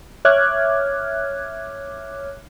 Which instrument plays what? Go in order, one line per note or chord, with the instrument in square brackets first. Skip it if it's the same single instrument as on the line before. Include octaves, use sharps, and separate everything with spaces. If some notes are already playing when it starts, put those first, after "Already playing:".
[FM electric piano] C#5 E5 D6 F6 F#6 G#6